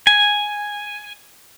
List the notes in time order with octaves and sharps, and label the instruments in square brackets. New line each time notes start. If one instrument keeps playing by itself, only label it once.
[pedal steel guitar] G#5